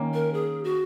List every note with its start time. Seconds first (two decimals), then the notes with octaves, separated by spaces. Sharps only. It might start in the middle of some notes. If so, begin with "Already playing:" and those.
Already playing: D#3 A#3 C#4
0.14 A#4
0.34 G#4
0.64 F#4